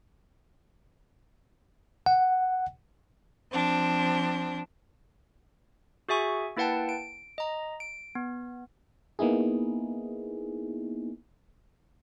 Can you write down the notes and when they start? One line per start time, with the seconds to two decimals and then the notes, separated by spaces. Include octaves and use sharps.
2.06 F#5
3.51 F3 C4 D4
6.09 F#4 G#4 E5 G#5 C#6
6.57 A#3 E4 B4 F#5 G5 A5
6.89 D7
7.38 D#5 A#5
7.80 D7
8.15 B3
9.19 A#3 B3 D#4 E4 G#4